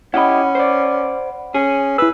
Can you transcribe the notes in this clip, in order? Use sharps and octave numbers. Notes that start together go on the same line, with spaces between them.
C#4 E4 G4 D#5 F#5 B5
C5 D5
C#4 G#4
E4 B4 E6